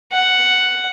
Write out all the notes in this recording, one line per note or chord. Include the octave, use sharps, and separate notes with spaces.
F#5